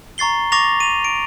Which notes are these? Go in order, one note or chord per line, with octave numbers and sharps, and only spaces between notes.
A#5 C#6 A6 C7 G7
C#6 D6 A6 A#6 F7
D#7 F7
D7